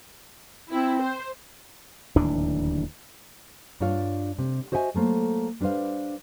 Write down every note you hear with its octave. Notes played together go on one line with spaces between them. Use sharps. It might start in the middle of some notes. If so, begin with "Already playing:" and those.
C4 E4
C5
D1 D#2 E3 D4
G2 D4 F4 C#5 F5
C3
F#4 C5 D#5 E5 G5 G#5
F#3 A3 A#3 C5
G3 D4 B4 C5 F5